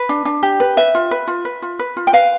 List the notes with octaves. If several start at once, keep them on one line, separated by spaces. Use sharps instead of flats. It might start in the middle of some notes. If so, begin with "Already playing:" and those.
Already playing: B4
D4
D4
G4
B4
B4 E5
F4
B4
F4
B4
F4
B4
F4
G5
B4 F5